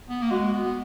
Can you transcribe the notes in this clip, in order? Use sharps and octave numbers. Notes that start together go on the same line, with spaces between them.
B3
A#3
G#3 F#4
B3